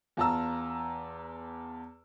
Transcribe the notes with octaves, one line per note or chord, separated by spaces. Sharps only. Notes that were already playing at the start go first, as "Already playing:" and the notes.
E2 F4 A5 A#5 E6